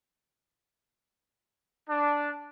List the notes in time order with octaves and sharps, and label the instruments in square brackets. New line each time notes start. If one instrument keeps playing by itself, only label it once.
[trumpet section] D4